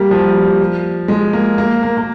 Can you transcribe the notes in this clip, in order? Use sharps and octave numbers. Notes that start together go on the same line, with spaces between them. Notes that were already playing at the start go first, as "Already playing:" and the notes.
Already playing: G3 A#3
F3
G#3
A#3
A#3
A#3
A#3